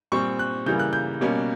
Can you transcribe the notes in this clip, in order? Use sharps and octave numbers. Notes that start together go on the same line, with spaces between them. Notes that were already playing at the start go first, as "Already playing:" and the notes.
A#2 G3 C4 C#6
F#6
C#3 E3 G3 A#3 G6
F#6
G6
B2 G3 A#3 C#4